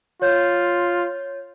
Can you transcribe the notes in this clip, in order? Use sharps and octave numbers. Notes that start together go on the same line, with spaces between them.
F4 C#5 G6